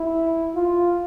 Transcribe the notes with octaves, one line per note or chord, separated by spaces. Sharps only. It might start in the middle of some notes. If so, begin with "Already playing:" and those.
Already playing: E4
F4